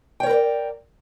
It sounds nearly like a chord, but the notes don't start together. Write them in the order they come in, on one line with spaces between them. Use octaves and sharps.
G5 C#5 A#4 B4 D5